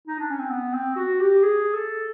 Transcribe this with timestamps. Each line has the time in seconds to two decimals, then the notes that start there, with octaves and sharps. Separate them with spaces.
0.08 D#4
0.19 D4
0.29 C#4
0.39 C4
0.50 B3
0.73 C4
0.96 F#4
1.20 G4
1.43 G#4
1.74 A4